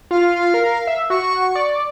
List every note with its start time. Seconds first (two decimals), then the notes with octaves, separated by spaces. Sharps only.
0.11 F4 F5
0.54 A#4
0.87 E5
1.10 F#4 C#6
1.55 D5